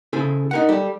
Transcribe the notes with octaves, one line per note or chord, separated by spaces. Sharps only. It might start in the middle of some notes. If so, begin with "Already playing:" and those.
C#3 E4 G#4 A4 C5
D#4 A#4 F#5
G3 A4